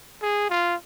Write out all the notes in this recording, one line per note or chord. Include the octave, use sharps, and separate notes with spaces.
G#4
F4